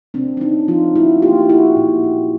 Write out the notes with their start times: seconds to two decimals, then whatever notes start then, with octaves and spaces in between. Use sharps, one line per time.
0.14 C3 C4 D4
0.37 D4
0.41 C3 C#4 D#4
0.68 F3 D#4 F4
0.95 A3 E4 F#4
1.22 A#3 F4 G4
1.42 F4
1.49 A#2 E4 F#4
1.76 A#2
2.04 A#2